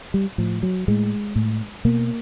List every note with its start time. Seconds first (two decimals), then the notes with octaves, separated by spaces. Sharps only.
0.14 G3
0.38 A2 F3
0.63 F#3
0.88 A2 G#3
1.36 A2
1.85 B2 A#3